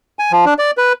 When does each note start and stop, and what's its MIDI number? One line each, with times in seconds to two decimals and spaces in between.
0.19 0.32 80
0.32 0.45 53
0.45 0.54 62
0.59 0.71 74
0.78 0.93 71